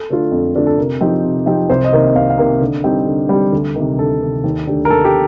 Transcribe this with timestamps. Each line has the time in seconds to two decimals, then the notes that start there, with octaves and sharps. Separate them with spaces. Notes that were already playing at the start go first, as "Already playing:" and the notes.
Already playing: A4
0.10 D3 A3 D4 F4
0.31 F2
0.55 D3 A3 D4 F4
0.67 A4
0.77 C3 A#4
1.01 F3 C4 D#4 G4
1.24 C3
1.46 F3 C4 D#4 G4
1.70 C2 C5
1.84 D#5
1.92 C3 D#3 A#3
2.00 D#5
2.15 C2 F5
2.30 F5
2.38 C3 D#3 A#3
2.61 D3
2.84 G3 C4 D#4 G4
3.06 D3
3.29 G3 C4 D#4 G4
3.53 D2
3.76 C3 D#3
3.98 D2 A4
4.21 C3 D#3
4.44 D#2
4.66 D3 A3 D4 G4
4.85 A#4
4.90 D#2 A4
5.05 G4